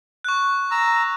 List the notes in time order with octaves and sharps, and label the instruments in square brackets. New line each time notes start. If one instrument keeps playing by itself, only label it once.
[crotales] C#6 F#6
[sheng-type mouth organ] A#5 E6